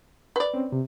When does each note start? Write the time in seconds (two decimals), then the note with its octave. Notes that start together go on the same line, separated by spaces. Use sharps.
0.36 B4 D5
0.54 C4 C#4
0.72 C3